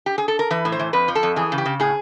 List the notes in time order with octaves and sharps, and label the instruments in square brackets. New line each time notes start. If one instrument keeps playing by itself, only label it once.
[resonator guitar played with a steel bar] G4
G#4
A4
A#4
E3 B4
A2
C5
E3
F2 B4
F3
A4
F2
E3 G#4
C#3
G4
C#3
A2 G#4